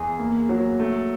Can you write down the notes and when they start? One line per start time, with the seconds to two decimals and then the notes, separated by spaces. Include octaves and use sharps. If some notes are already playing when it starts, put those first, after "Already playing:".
Already playing: E2 G#4
0.19 A#3
0.49 F#3
0.80 A3